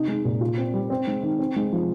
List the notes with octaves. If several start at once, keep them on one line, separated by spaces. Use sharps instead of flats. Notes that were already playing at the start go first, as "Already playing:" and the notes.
Already playing: C3 D#4
G#3
A#2
F4
C4
G3
C4
G#3
D#3
C4
G#3
F3